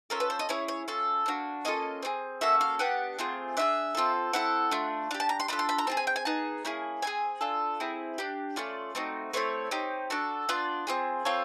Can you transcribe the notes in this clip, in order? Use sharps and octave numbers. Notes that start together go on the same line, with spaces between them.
C#4 F4 A4 A#4
B4
C5
D#5
C#4 E4 G#4 C#5
C#5
C#4 F4 A4
A#3 D4 F#4
A#3 C#4 F4 A4 D#5
C4 F4 G#4
A#3 C#4 F#4 A4 E5
F5
B3 D4 G4 F#5
A3 C4 F4 G#4
D4 F4 G#4 E5
C4 F4 A4
C4 E4 A4 F#5
A3 D4 F4
D4 G4 F5
A5
A#5
C6
D4 F4 A4 B5
C6
B5
A#5
C4 F4 G#4 A5
G#5
G5
G#5
B3 D#4 G#4 A5
A#3 C#4 E4 G#4
C4 E4 G#4 G#5
D4 F4 A4
C4 E4 G#4
D4 G4
A3 C#4 F4 D5
A3 C4 D#4 F#4
A3 C4 E4 A4 C#5
C4 D#4 G4
D4 F#4 A4
B3 D4 F4 D5
C4 F4 G#4
C4 F4 A4 C#5